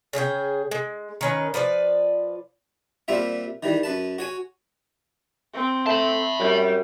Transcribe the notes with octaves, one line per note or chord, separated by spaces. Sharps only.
C#3 G#4 C5 G5
G#3
D#3 C#4 B4
F3 B4 C#5 D5
A#2 G3 C4 F4 E5
D#3 E3 G3
F#2 B4 A5
F#4 C#5 G#5
C4
A3 E5 A5 B5
F#2 G3